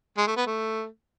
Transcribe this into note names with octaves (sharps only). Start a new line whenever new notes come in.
G#3
A3
B3
A3